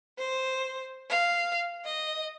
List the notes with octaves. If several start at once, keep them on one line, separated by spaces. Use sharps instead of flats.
C5
F5
D#5